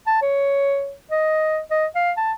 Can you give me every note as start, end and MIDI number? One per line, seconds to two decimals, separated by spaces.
0.07 0.21 81
0.22 0.94 73
1.11 1.59 75
1.71 1.86 75
1.95 2.12 77
2.17 2.32 81